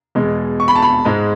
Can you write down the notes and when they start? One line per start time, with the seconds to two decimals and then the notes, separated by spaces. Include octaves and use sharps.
0.15 E2 B2 G#3
0.60 C#6
0.68 B5
0.75 A5
0.82 B5
1.05 G#2 G#3